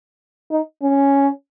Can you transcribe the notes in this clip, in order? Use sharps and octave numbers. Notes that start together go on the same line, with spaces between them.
D#4
C#4